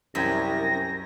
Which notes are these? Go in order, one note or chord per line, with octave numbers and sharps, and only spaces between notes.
C2 F#2 D#5 G5 G#5 A#6